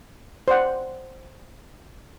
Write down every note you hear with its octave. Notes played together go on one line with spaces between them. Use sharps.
C5 D5 F#5